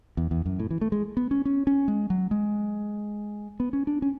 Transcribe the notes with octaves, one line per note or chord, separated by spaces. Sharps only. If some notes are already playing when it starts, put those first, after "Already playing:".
E2
E2
F#2
A2
E3
A3
G#3
B3
C#4
C#4
C#4
G#3
F#3
G#3
B3
C#4
D4
C#4